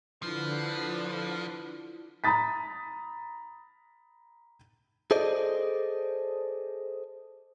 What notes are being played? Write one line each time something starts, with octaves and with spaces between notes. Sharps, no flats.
D3 F3 D4 E4 F4 B4
A#5 B5 D#6 A6 B6
G#4 A4 C5 D5 D#5